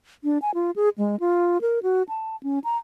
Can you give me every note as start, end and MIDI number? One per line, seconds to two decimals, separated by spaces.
0.24 0.38 62
0.42 0.51 80
0.55 0.71 65
0.76 0.89 68
0.98 1.19 56
1.20 1.61 65
1.61 1.79 70
1.83 2.03 66
2.09 2.36 81
2.43 2.59 61
2.64 2.77 82